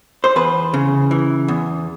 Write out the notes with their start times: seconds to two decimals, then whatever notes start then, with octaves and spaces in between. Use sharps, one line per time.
0.24 C5
0.36 E2 B4
0.74 C#3
1.11 E3
1.48 E2